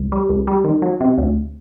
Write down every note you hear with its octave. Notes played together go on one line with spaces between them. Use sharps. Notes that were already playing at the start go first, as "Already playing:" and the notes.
Already playing: C#2
G3
C#2
G3
D#3
F#3
C3
D2